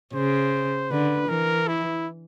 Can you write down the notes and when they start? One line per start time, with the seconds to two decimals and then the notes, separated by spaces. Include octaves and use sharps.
0.13 C#3 C5
0.91 D3 B4
1.29 E3 A#4
1.68 E4